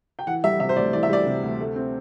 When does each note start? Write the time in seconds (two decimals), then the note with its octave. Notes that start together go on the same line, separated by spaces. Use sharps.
0.19 G5
0.27 E3 F#5
0.44 G3 E5
0.60 C3 E5
0.69 C5
0.76 D2 D5
0.93 E3 D5
1.03 E5
1.10 G3 D5
1.26 C3
1.43 D2
1.59 A3
1.76 C4